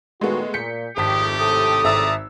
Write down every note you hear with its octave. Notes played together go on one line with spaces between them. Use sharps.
A#2 D#3 G#3 A3 B3 F#4
A#2 G6 B6 C#7
G#1 F2 A3 G4 A5 D#6 B6
A2 C3 A4 D#6
G#1 D5 E5 A5 A#5 E6